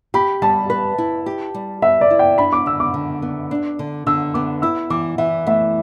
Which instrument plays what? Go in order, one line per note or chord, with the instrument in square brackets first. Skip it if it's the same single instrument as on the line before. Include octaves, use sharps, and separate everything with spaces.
[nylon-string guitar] G4 [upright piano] B5
[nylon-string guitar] G3 [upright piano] A5
[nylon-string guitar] B4
E4
G4
G3
[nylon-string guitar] B4 [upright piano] E5
[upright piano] D5
[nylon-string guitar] E4
[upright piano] G5
[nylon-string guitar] D4 [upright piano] B5
[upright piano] D6
[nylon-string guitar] D3 [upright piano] E6
[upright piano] D6
[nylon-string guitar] D3
B3
D4
D3
[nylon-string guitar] D3 [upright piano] E6
[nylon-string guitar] B3 [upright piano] D6
[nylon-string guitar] E4 [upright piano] E6
[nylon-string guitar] E3 [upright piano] D6
[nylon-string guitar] E3 [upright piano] E5
[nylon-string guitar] A3 [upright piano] E5